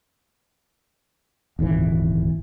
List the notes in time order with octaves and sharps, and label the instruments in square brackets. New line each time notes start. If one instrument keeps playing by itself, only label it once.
[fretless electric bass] D#1 G#1 D2 E3